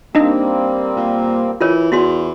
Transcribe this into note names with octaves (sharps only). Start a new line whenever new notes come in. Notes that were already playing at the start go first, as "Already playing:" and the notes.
G3 A#3 C4 D4 D#4 D#5
A#2
E3 F4 A#4 C#5
E2 E4 F#4 C6